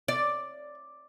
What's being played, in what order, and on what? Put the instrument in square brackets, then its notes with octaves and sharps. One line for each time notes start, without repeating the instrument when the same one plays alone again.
[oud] D5